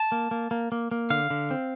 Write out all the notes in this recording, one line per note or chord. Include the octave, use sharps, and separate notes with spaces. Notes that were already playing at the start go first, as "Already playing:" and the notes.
Already playing: A5
A#3
A#3
A#3
A#3
A#3
D3 F5
D3
C4